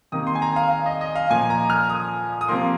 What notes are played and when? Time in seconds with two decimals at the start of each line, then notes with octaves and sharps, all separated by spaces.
0.12 C3 D#3 A#3 D#6
0.27 C6
0.35 G#5
0.42 A#5
0.56 F5
0.71 F5
0.86 D#5
1.01 D#5
1.16 F5
1.30 A#2 F3 A#3 G#5
1.50 A#5
1.70 F6
1.89 D#6
2.41 D#6
2.48 C3 F3 A#3 C6